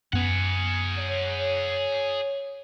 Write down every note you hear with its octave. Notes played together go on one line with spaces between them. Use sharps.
F#2 B3 G#4 F#5
C#5